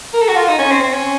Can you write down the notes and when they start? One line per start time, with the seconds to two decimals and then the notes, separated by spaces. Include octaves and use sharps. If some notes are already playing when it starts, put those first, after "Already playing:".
0.13 A#4
0.21 A4
0.28 F#4
0.36 F4
0.48 D#4
0.58 C#4
0.71 C4
0.82 C4
0.93 C#4